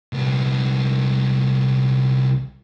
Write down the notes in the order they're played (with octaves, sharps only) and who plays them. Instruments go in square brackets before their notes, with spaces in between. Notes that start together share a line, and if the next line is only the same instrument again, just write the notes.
[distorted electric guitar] C2 B3